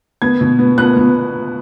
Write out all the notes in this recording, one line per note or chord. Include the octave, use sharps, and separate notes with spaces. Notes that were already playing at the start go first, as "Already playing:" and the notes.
B3 G#6
B2
B3
B3 F#6
B3